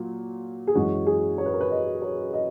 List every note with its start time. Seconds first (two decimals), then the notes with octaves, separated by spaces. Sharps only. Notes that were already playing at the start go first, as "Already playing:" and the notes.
Already playing: A#2 F#3
0.67 G#4
0.75 F#2 E3 G#3 C#4 F#4
1.06 G#4
1.38 C#5
1.46 B4
1.52 A#4
1.61 B4
1.71 D#5
2.02 C#5
2.33 D#5